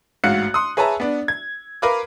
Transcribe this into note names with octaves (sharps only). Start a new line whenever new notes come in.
A1 G#2 F#4 F5 F#6 C#7
C6 D#6
G#4 B4 C#5 E5 A5 A#5
B3 D4
G#6
A#4 B4 F5 B5 D6